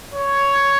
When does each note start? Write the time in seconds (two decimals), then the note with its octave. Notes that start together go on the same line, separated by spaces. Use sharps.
0.14 C#5